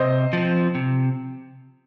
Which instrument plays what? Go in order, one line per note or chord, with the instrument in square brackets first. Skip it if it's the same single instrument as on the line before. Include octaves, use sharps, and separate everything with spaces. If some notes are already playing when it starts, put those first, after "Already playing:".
Already playing: [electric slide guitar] C3 [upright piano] C5 D#5
[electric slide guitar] F3 C4
C3